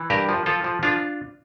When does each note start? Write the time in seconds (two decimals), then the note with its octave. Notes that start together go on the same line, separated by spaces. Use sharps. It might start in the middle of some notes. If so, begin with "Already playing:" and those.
Already playing: E3
0.10 G2 G4 A#4
0.29 F3
0.46 F3 F4 A4
0.64 F3
0.83 F3 D4 F4